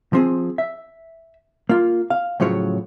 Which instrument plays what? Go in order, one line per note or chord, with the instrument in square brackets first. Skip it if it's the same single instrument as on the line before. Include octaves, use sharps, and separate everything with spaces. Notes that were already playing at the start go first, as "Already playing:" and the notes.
[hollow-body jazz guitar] F3 C4 G#4
E5
A#3 F4
F5
A2 C#3 F3 F#3 C#5